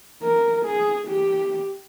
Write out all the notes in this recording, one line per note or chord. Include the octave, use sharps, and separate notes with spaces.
A#4
G#4
G4